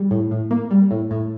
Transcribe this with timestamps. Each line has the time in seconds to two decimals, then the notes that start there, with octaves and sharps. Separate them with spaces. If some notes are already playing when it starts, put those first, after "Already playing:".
Already playing: G3
0.11 A2
0.31 A2
0.51 A#3
0.71 G3
0.91 A2
1.11 A2